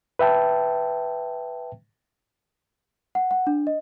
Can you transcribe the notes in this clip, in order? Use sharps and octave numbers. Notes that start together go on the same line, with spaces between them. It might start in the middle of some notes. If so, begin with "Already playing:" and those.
B4 E5 G5 A5
F#5
F#5
D4
D#5